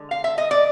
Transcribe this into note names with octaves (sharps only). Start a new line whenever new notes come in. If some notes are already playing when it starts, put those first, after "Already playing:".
Already playing: D3 G#3
F5
E5
D#5
D5